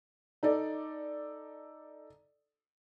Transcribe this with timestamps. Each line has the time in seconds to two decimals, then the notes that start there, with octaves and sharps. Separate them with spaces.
0.43 D#4 A4 D5